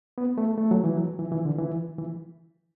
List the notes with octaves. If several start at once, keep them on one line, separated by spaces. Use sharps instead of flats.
B3
A3
A3
F#3
E3
F#3
E3
E3
D3
E3
E3